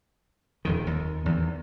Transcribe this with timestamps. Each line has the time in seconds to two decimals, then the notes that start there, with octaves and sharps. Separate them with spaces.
0.65 D#1 F2 D#3
0.87 D#2
1.26 E2 D#3